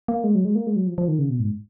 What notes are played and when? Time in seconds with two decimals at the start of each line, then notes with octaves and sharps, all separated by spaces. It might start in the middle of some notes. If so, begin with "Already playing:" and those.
0.08 A#3
0.24 G#3
0.35 F#3
0.45 G#3
0.55 A#3
0.67 G#3
0.76 F#3
0.87 F3
0.98 F3
1.08 D#3
1.19 C#3
1.30 B2
1.40 G#2